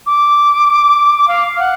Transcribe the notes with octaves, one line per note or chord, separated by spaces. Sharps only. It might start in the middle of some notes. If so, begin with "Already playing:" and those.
D6
F5
F#5